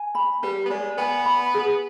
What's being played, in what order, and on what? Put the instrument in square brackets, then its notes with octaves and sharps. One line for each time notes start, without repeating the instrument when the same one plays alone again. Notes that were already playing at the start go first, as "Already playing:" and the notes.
Already playing: [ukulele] G#5
B5
[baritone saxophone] G3 [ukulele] B4
[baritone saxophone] B3
[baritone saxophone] G#3 [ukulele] D5
[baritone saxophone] B3 [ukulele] G#5
[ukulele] B5
G#4